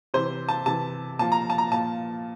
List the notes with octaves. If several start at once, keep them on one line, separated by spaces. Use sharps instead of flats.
C3 E3 C5
A5
C3 E3 A5
A#2 F3 A5
A#5
A5
A#5
A#2 F3 A5